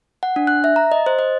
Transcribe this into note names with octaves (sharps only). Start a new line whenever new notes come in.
F#5
D4
F#6
E5
A#5
D#5
C5
D#5